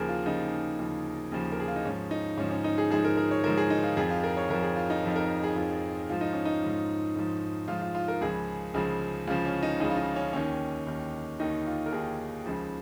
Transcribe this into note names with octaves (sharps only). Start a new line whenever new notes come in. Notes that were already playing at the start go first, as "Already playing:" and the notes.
Already playing: D#2 C#3 F3 G#4 A#4
F4
D#2 C#3 F3 D#4
D#2 C#3 F3
D#2 C#3 F3
A#4
G#4
F4
D#4
G#2 F3 C#4
D#4
G#2 F3 C#4
C#4
D#4
G#4
G#2 F3 G#4
A#4
A#4
C#5
G#2 F3 A#4
G#4
D#4
F4
F2 F3 G#4
F4
A#4
C#5
F2 F3 A#4
G#4
F4
D#4
F2 F3
A#4
G#4
F2 F3 F4
G#2 F3 F4
D#4
C#4
D#4
G#2 F3
G#2 F3
G#2 F3 F4
F4
F4
A#4
C#2 C#3 F3 G#4
C#2 C#3 F3
C#2 C#3 F3 F4
C#4
D#4
C#2 C#3 F3 D#4
F4
D#4
C#4
D#2 D#3 C#4
D#2 D#3
D#2 D#3 D#4
F4
A#4
D#2 D#3 G#4
C#2 C#3 F3